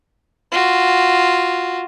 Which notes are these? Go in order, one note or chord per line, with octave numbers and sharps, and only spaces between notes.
F4 F#4